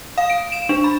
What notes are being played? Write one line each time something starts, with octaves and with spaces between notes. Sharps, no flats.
F5
D7
E7
D4
B5